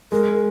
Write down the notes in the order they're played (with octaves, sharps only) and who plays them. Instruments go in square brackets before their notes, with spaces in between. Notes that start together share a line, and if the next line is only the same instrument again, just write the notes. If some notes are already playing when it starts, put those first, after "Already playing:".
[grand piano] G#3 [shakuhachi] A#4